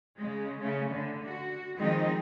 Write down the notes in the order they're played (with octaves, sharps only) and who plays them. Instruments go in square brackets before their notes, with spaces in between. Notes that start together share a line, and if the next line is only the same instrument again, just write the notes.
[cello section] C#3 G#3
C#3 A3
D3
F#4
D#3 F3 G3 G#3 C4 D#4